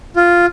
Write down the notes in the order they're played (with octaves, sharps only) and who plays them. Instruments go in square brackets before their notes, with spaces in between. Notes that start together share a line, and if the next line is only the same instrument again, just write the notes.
[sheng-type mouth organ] F4